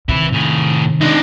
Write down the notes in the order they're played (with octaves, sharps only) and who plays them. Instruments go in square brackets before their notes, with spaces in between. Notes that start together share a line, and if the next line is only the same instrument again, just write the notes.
[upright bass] C3 D#3 [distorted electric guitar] E3 E4
[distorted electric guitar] A2 G#4
[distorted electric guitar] G#3 C4 [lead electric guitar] D4 D#4